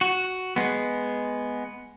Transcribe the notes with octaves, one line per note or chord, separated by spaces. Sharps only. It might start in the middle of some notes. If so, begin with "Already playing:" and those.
F#4
G#3 B3